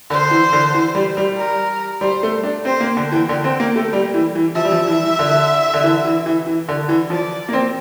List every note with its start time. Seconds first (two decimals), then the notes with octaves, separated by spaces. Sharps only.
0.10 D3 C5
0.31 E3
0.53 D3
0.74 E3
0.95 G3
1.17 G3
1.37 A#4
2.01 G3 C5
2.23 A3
2.44 D4
2.65 C4 C5
2.80 A#3
2.97 D3 G5
3.12 E3
3.29 D3
3.44 C4
3.60 A#3
3.76 A3
3.93 G3
4.14 E3
4.35 E3
4.55 F3 E5
4.65 G3
4.72 F3
4.87 E3
5.03 E3
5.19 D3
5.74 D3
5.84 E3
6.05 E3
6.26 E3
6.46 E3
6.69 D3
6.89 E3
7.10 F3 D5
7.49 A#3
7.53 C4